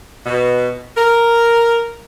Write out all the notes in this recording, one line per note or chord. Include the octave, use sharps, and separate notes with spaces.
B2
A#4